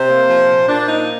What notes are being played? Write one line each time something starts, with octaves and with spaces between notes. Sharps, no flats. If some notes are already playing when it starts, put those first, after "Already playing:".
Already playing: C3 C5
A#3
F3
A#2
A#2 D4
A#3 D#4